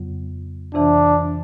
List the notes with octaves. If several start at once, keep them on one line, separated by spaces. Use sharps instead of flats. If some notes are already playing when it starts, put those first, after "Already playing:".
Already playing: F2 C#3 F#3 B3
F2 C3 E3 D4